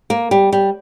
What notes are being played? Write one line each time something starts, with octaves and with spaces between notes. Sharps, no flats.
A#3
G3
G3